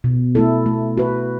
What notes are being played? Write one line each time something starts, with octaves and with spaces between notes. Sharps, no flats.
B2
A3 E4 A4
A3
F#4 B4